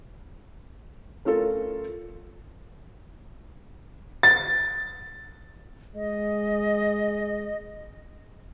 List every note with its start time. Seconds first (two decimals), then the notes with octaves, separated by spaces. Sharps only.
1.25 A3 C#4 F4 A4 A#4
4.23 A6
5.95 G#3 D#5